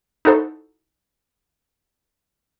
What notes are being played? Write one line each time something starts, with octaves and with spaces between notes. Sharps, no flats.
D#4 E4 F#4 A4 C5